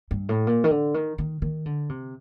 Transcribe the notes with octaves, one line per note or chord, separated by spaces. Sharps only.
G2
A2
A#2
D#3
D3
D#3
D#3
D#3
D3
C3